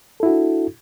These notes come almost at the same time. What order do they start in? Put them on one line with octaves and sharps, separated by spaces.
A4 E4 F#4 D4